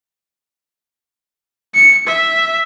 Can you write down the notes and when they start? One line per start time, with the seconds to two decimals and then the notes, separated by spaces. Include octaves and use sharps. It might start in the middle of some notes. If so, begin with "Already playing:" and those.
1.75 C#7
2.07 E5